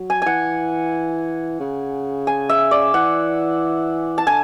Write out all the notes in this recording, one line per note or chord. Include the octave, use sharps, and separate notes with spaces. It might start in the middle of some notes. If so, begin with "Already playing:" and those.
Already playing: F#3
G#5
E3 F#5 G#5
C#3
G#5
E5
D5
E3 F#5
A5
D3 G#5